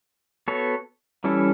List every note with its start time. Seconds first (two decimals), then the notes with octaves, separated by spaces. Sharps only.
0.48 B3 F#4 A4 C#5
1.24 E3 G3 C#4 E4 A4